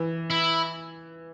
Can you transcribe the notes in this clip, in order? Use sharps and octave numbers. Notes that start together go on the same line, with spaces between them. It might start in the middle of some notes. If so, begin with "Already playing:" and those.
Already playing: E3
E4